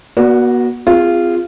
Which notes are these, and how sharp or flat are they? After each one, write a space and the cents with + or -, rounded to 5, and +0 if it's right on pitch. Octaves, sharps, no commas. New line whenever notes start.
B3 -40 F#4 +0 D5 +0
C4 -25 F4 -15 G#4 -20